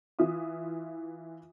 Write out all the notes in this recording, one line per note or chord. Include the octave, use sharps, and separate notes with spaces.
E3 F4 E5 D#6